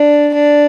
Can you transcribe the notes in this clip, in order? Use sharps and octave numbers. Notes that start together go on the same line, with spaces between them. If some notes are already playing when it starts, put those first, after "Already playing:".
Already playing: D4
D4